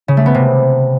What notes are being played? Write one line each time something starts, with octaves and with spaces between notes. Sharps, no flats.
C#3
A3
B3
C3